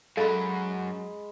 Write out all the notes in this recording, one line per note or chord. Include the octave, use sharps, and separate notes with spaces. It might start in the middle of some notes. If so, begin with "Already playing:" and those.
F#2 F#3 G#3 A4 F5 B5 C6 A6